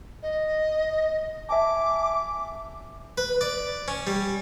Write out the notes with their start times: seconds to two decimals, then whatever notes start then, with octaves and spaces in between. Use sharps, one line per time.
0.23 D#5
1.49 E5 G#5 A5 D6
3.18 B4
3.41 D5
3.88 C#4
4.07 G3